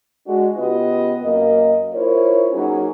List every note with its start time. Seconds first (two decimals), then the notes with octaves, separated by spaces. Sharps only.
0.27 G#3 D4 F#4
0.57 C#3 B3 F4 G4 B4 D#5
1.22 F#2 A#3 D#5
1.93 E4 F4 A#4 C5 C#5
2.53 F#3 A#3 C#4 D#4 F#4 G#4